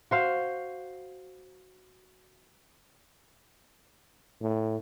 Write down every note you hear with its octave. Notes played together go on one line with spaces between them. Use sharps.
F#4 C5 F5
A2